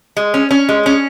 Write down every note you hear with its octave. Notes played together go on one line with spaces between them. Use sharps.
G#3
C#4
C#4
G#3
C#4